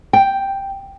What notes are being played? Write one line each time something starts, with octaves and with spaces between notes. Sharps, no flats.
G5